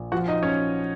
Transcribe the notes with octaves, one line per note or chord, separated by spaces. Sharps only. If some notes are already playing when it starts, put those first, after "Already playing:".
Already playing: A#1
F3 F#4 F#5
D#4 D#5
C#4 C#5